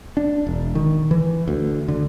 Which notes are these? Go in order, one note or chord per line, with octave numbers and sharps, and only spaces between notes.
D4
E1
D#3
E3
D2
D3